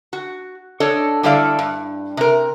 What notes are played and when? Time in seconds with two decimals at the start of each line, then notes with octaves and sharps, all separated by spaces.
0.13 F#4
0.80 D4 A4 C#5 D#5
1.23 D3 G3 A3 E4 D5 F5
1.59 G2
2.17 C3 A#4